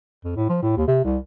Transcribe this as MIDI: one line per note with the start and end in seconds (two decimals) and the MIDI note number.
0.25 0.34 41
0.36 0.44 45
0.49 0.58 53
0.62 0.74 45
0.76 0.84 39
0.88 1.03 48
1.04 1.17 36